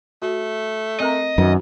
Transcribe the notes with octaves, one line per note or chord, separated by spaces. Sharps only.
A3 F#4
C4 A#4 D#5 A#5
F#2 D#3 D#4 F#4